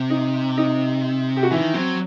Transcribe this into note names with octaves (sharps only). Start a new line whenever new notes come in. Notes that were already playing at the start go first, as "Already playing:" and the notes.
Already playing: C3
D#4
D#4
G4
F#4
D#3 E3 E4
F#3 C4